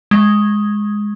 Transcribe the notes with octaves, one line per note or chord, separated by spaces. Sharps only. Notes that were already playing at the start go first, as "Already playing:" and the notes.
G#3